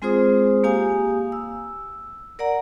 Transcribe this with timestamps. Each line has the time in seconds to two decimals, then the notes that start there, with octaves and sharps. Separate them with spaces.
0.02 G#3 C4 F4 G#4 C5 D#6
0.64 A#3 G4 F5 G#5 D#6
1.32 E6
2.39 A#4 D5 F#5 A#5